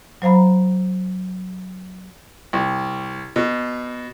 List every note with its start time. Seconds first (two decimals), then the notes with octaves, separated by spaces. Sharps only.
0.22 F#3 C5 F5 A#5 B5
2.53 C2
3.36 B2